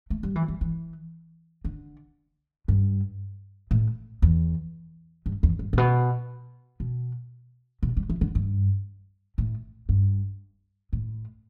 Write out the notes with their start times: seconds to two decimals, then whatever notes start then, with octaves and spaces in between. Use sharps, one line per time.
0.10 A3
0.23 G3
0.35 E3
0.48 G3
0.61 E3
1.65 D3
2.68 G2
3.71 A2
4.22 E2
5.26 G2
5.43 E2
5.59 G2
5.73 A2
5.78 B2
6.80 B2
7.83 B2
7.97 G3
8.10 E3
8.21 D3
8.35 G2
9.38 A2
9.89 G2
10.93 A2